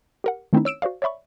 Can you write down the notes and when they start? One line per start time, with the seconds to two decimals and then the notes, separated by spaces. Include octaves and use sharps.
0.24 G4 A#4 F#5
0.53 D#3 A3 C4 C#4 D#4 E4
0.65 C#5 E6 D7 E7
0.82 F#4 C5 D5 F5
1.02 C#5 D5 E5 B5 C#6